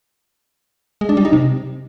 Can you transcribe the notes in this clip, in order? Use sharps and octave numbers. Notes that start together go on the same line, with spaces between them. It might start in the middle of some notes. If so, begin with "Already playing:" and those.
G#3
D4
G3
D#4
C3